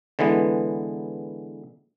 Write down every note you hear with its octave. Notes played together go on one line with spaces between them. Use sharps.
D3 E3 G#3 B3